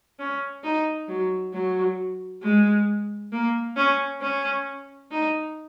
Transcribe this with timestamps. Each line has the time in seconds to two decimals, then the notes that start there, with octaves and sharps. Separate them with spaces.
0.19 C#4
0.64 D#4
1.08 F#3
1.53 F#3
2.43 G#3
3.32 A#3
3.77 C#4
4.22 C#4
5.11 D#4